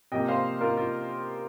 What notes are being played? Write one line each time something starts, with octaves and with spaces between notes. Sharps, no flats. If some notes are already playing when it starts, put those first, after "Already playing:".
C3 F3 A#3 D#5 G5
C5 F5
F4 A#4
F4